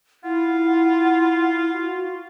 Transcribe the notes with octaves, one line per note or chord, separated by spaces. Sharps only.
E4 F4 F#5
F#4